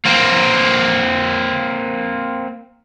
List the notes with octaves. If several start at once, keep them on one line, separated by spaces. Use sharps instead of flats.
A#3 C4